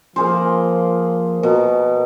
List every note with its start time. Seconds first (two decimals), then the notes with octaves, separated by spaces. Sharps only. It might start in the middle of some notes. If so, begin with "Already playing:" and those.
0.16 F3 A#3 G#4 C5
1.43 B2 A#4